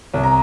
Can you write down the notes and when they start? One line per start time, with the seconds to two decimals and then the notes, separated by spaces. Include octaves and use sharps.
0.14 C2
0.23 A#5